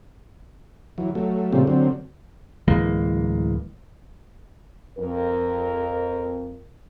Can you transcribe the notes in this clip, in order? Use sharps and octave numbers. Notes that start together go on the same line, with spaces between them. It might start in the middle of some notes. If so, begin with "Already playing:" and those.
E3 F#3
F#3 A3
A#2 C#3 F3 G3 A3 C4
D3 F#3 C4
D1 E3 G#3 A#3
F2 A#4